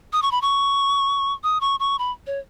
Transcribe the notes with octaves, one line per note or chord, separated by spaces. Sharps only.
D#6
C#6
B5
C#6
D#6
C#6
C#6
B5
C#5